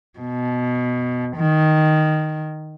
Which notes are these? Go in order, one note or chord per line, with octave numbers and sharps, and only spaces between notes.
B2
D#3